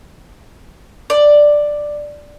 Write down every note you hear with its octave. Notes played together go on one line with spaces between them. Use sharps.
D5